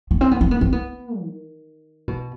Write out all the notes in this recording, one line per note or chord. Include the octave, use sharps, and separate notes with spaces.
B3
C4
B3
C4
B3
C4
B3
D#3
B2